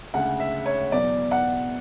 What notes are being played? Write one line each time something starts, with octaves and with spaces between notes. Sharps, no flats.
D2 C#3 G#3 F#5
E5
C#5
E2 B2 F#3 D5
F#5